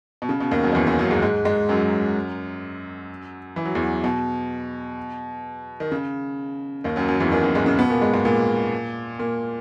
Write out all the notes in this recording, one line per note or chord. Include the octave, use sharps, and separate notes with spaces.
B2
C#3
B2
D#2 D#3
F#2 F#3
D#3
E2 E3
D#2 D#3
F#2 F#3
G#2 G#3
G#2 G#3
G#2 G#3
F#2 F#3
E3
F#3
E2 E3
B2
D#3
C#3
D#2 D#3
F#2 F#3
F#2 F#3
E2 E3
D#2 D#3
F#2 F#3
G#2 G#3
C#3
B2 B3
A#2 A#3
G#2 G#3
G#2 G#3
A#2 A#3
A#2 A#3